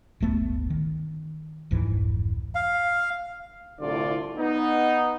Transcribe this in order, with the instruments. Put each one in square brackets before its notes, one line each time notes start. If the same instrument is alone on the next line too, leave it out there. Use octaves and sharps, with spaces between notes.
[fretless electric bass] D1 G1 A3 B3
D#3
F1 C#2 G#2 E3
[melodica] F5
[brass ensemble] C2 A2 D3 F4 D5
B3 D#4